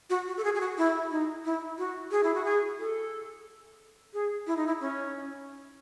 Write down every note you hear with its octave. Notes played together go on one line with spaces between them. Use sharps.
F#4
F#4
A4
G#4
G#4
F#4
E4
D#4
E4
F#4
G#4
E4
F#4
G#4
A4
G#4
E4
D#4
E4
C#4